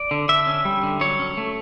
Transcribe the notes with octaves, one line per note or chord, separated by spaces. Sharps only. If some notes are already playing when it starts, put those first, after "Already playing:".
Already playing: D5
D3
D3 E5
C#4
G3
D3
F#3 C#5
C#4
A3